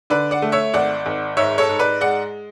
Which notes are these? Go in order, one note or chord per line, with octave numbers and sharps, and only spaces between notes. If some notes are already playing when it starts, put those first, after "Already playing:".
D3 B4 D5
D5 F#5
A3
C#5 E5
G#1 D5 F#5
G#1
G#2 C#5 E5
A4 C#5
G#2
B4 D5
G#3 D5 F#5